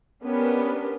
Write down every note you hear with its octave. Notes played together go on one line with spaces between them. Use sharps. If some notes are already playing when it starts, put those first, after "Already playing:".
B3 C#4 D4 G4 A#4 B4